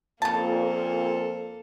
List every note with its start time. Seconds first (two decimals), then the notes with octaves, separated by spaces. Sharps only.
0.22 F2 A#2 C#3 A#3 A4 A5